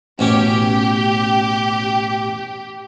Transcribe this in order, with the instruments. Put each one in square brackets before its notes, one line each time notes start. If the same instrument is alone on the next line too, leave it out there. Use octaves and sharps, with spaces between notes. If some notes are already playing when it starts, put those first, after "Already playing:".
[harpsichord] A1 B2 C#4 [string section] G4